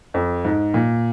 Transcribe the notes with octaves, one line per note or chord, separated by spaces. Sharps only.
F2
G#2
A#2